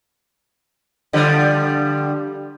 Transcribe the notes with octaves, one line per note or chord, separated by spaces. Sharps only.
D3 F3 G3